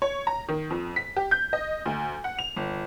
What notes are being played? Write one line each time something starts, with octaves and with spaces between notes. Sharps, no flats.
C#5
A#5
D#3
F2
B6
G4
G6
D#5
D2
F#5
F7
G1